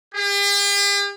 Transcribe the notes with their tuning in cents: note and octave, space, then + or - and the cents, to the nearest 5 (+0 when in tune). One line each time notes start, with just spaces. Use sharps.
G4 +45